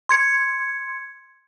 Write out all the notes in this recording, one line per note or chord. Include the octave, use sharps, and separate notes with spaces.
C6 G#6 C#7